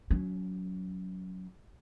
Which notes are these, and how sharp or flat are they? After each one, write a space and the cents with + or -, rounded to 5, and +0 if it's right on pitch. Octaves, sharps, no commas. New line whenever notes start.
F#3 +0 C#4 +25